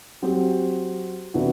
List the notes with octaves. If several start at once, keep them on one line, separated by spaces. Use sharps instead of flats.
F#3 C4 G4
C3 E3 B3 D4 F#4